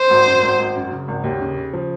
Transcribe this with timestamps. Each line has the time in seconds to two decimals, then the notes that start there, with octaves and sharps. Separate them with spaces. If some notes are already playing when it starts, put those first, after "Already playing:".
Already playing: C5
0.11 G#1
0.26 F#2
0.43 G#1
0.59 G#1
0.75 F#2
0.91 C#3
1.08 G#1
1.24 D#2
1.41 C#3
1.57 C#3
1.73 F3